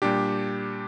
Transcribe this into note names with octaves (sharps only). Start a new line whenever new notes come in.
A#2 G3 D4 G4